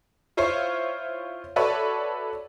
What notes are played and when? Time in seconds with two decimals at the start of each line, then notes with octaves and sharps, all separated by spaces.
0.37 E4 F4 C5 C#5 F5
1.56 F#4 A4 B4 C#5 D5 E5